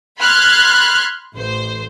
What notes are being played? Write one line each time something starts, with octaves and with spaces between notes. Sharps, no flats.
B5 C6 F6 F#6 G#6 A6
A1 C5